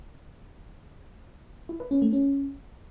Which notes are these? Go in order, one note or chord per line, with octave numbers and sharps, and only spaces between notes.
E4
B4
C#4
A3
C#4